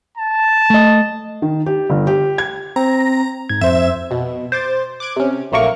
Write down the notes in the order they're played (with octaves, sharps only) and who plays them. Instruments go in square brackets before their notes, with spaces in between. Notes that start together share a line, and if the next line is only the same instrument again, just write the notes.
[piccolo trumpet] A5
[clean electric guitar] A3 D#5
[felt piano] D#3
G4
G1
G4
G#6
[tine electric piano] C4 [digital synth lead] A#5
[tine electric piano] G#2 G#6
[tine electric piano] F2 C5 [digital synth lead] E5
[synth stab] B2
C5 D6 A6
D6 F#6 G#6 D7
C3 C#4
A#1 F#3 A3 A#3 A#4 C#6